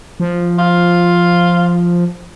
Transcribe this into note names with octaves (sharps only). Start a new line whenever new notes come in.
F3
F4